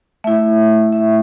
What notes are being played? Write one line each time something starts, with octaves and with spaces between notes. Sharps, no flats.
A3 E4 E5
E5